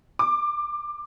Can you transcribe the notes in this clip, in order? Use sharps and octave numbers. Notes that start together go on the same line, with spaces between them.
D6